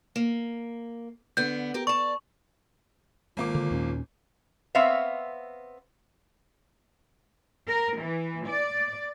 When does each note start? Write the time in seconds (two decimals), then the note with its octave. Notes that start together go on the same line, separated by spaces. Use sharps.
0.16 A#3
1.37 D3 B3 G6
1.74 G4 A#4
1.87 D5 A5 C#6
3.37 G#1 A#3 F4 D6
3.55 D3
3.71 D#2 A#2 C#4
4.75 B3 C4 C#5 E5 F5
7.68 A#4
7.99 E3
8.47 D5